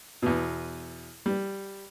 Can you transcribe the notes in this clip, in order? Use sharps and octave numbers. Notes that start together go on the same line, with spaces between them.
E2 B2
G3